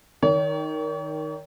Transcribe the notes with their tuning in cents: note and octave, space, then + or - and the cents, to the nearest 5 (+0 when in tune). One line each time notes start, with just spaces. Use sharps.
D#3 +0 C#5 +40